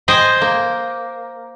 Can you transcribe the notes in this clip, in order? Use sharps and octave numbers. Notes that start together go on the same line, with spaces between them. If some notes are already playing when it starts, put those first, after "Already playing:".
C5 D#5 G5 G#5
A#3